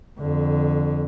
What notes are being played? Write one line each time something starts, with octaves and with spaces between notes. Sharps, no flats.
F2 D3